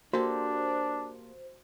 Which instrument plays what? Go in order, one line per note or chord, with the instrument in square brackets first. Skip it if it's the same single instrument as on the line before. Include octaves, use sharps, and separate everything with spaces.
[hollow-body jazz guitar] A#3 G4 A4 [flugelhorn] D4 [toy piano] F#4 [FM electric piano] C5